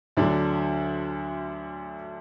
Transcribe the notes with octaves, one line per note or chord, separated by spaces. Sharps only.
D2 D3 F#3 D4